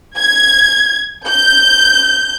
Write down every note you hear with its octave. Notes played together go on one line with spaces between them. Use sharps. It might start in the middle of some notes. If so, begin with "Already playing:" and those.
G#6
G6